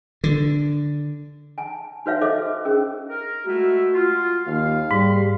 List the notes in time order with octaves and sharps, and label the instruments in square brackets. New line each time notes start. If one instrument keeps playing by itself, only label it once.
[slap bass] D3
[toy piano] G#5 A5
D#4 F#4 B4 C#5 E5 F5
A4 C5 D#5 E5 D6
C#4 G#4 A#4
[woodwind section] A#4
[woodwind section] G#3 A3 E4 [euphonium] F#4
[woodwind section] F4
[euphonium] D#2 [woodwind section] F5
[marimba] G#2 [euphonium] G3